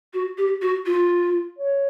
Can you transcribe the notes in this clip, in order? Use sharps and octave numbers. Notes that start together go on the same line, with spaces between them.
F#4
G4
F#4
F4
C#5